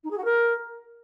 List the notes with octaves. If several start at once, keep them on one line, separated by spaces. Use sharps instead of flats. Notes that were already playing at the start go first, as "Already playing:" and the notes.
D#4
G#4
F#4
A#4